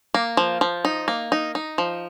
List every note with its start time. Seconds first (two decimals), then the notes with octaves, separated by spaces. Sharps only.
0.14 A#3
0.37 F3
0.61 F3
0.85 D#4
1.08 A#3
1.32 D#4
1.55 D#4
1.78 F3